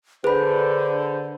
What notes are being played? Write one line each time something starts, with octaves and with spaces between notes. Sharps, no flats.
D3 G#4 B4 C5 B5